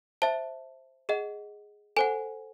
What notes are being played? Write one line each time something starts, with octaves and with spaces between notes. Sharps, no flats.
C5 E5 A5
G#4 D#5 F#5
A4 C5 F#5 G#5